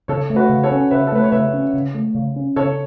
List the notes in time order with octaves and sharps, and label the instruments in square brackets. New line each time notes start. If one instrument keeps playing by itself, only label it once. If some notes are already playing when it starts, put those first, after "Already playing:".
[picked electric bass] C#3 [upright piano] A4 C#5
[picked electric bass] A3
[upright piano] F#4 B4
[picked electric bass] C#3
[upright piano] A4 C#5
[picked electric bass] C#4
[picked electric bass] C#3 [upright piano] B4 E5
[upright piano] A4
[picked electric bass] A3 [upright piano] B4
[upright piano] C#5
[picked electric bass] C#3 [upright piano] B4 E5
[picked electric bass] C#4
C#3
A3
C#3
C#4
[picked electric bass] C#3 [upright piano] A4 C#5